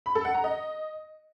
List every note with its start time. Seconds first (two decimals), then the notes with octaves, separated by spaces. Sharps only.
0.06 B5
0.15 A4
0.25 F#5
0.34 A#5
0.44 D#5